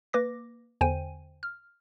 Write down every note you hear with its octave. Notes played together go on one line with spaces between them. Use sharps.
A#3 B4 D6 A#6
E2 D3 C5 G5 G#5 D#7
F6